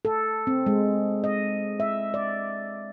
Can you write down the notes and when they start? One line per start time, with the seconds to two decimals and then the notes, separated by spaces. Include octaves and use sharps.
0.05 A4
0.47 C4
0.66 G#3
1.24 D#5
1.80 E5
2.14 D5